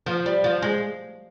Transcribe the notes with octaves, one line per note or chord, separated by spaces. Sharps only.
F3
G3
F3
G#3